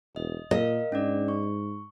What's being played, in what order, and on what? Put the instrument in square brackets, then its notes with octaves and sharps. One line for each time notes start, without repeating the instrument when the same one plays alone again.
[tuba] E1 [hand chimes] D#5
[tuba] A#2 [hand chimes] A#4 F5 [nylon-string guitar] D#5
[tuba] G#2 [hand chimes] C#4 D4 D5
[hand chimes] C#6